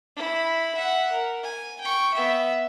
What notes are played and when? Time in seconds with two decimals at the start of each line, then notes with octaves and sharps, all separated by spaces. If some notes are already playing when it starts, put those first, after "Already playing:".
0.16 E4 B5
0.76 E5 F#5
1.12 A#4
1.44 G#5
1.81 G5 C#6
2.14 B3 E5